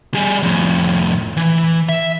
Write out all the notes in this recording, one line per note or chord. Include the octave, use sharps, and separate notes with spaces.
G3 G#4
F2 A2
E3
E5